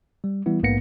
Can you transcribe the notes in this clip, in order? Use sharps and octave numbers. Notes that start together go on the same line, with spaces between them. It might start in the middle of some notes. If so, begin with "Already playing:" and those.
G3
E3 G3 B3 E4
A#1 G#2 A#3 B3 A#6 C#7